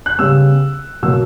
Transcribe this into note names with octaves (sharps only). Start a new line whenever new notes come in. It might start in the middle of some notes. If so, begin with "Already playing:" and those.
F#6
C#3 G3 B3 E6
B2 F#3 A#3 E6